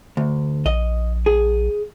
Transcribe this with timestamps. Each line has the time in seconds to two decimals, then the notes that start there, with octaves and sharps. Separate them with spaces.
0.17 D2
0.66 A#1 D#5
1.26 G#4